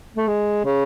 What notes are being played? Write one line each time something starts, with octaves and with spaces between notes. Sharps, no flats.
A3
G#3
C#3